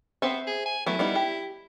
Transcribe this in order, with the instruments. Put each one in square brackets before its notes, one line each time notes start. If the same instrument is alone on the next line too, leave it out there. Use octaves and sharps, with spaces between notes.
[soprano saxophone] B3 [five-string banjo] C4 C5 E5
[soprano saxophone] G#4
G#5
[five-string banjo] F#3 A3 B3 [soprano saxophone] E4
[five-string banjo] G3 B3 D#4
G4